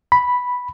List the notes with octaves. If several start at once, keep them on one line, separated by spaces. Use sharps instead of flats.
B5